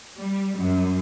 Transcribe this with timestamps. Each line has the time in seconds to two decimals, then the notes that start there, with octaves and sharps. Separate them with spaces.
0.17 G3
0.59 F#2